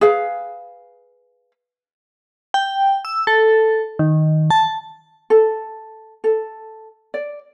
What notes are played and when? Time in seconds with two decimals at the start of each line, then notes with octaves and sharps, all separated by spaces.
0.01 G#4 B4 F5
2.54 G5
3.05 E6
3.27 A4
3.99 D#3
4.50 A5
5.30 A4
6.24 A4
7.14 D5